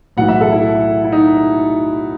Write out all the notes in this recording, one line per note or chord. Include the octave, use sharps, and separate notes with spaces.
B1 A2 E3 F#5
E5
A4
E4
E4
D#4